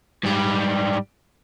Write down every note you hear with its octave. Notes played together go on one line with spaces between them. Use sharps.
G#2 G3